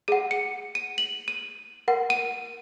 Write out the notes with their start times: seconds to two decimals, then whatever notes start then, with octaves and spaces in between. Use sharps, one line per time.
0.08 G#4 F#5 D#7
0.31 C#7
0.75 D#7
0.98 F#7
1.28 D#7
1.88 A#4 F#5
2.10 D#7